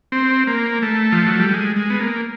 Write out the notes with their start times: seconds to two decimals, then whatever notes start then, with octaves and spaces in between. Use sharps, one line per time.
0.12 C4
0.47 A#3
0.82 A3
1.12 F3
1.26 F#3
1.40 G3
1.53 G#3
1.76 G#3
1.90 B3
2.00 A#3